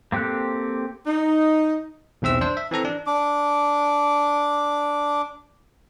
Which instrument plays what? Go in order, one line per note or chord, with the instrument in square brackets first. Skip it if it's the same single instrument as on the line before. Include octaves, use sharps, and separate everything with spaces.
[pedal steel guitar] A#3 C4 G4 A4 F#6
[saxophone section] D#4
[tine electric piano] B1 E2 C4 E5 E6
D4 C5
E5
E3 C4 A4 A#5
D4
[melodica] D4 D6